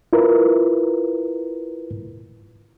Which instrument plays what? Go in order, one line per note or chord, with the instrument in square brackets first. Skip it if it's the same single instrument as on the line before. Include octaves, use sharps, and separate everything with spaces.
[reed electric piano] E4 F4 A#4 B4